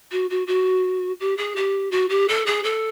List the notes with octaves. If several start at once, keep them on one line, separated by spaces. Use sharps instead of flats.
F#4
F#4
F#4
G4
G#4
G4
F#4
G4
A4
G#4
A4